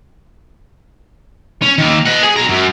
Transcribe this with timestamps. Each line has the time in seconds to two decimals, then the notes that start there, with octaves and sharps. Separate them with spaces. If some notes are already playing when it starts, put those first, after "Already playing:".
1.62 C#4
1.78 D#3 A#3
2.06 D#5 F#5
2.23 G#4
2.36 B2 A#5
2.48 F#2